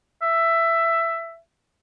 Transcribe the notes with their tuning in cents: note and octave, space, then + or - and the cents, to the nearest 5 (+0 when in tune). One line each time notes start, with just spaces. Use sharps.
E5 +15